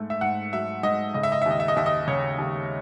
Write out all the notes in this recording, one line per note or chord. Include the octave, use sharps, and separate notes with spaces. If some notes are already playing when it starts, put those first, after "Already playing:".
Already playing: G#2 A3
E5
G#2 F#5
F#3 E5
G#2 D#5
C#3 D#5
E5
D#5
E5
D#2 D#5
E5
D#5
D#2 E5
D#5
C#3 C#5
D#2